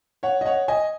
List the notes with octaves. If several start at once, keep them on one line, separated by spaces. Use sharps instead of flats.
C#5 F#5
D#5
C#5 F#5
D#5 G#5